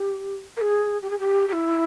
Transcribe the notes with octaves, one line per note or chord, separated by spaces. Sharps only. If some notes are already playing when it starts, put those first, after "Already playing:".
Already playing: G4
A#4
G#4
G4
G#4
G4
G4
E4